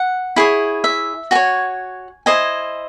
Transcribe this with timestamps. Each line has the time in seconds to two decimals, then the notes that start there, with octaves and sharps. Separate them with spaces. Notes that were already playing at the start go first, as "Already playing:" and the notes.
Already playing: F#5
0.36 E4 G#4 C#5
0.84 E5
1.31 F#4 C#5 G#5
2.26 E4 C5 D#5 G#5